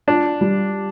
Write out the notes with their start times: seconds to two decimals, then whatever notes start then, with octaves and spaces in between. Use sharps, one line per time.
0.07 D4 F4
0.41 G3